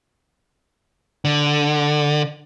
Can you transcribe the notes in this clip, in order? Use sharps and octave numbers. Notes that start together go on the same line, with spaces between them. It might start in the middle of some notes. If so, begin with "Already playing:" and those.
D3